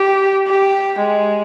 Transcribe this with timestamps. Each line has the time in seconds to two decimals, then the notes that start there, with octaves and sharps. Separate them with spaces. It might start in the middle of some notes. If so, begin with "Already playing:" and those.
Already playing: G4
0.47 G4
0.99 G#3